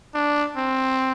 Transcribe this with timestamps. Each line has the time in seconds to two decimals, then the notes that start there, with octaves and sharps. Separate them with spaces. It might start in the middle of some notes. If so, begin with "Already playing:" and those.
0.14 D4
0.57 C4